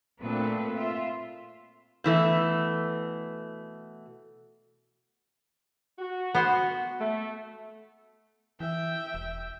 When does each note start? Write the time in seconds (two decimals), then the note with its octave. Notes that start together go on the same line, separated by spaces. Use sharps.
0.21 A#2 A3 C4 D4 A4 B4
0.76 F4 E5
2.04 B2 E3 A3
5.99 F#4
6.35 B3 C5
7.00 A3
8.60 E3 E5 G5
9.14 E1